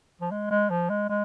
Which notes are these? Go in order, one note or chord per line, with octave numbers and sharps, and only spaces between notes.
F3
G#3
G#3
F3
G#3
G#3